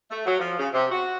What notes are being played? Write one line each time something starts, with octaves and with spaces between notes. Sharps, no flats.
A3
F#3
F3
C#3
C3
F#4